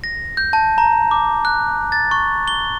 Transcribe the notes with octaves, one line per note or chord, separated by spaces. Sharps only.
A#6
G6
A5
A#5
D6
F#6
A6
C#6
G7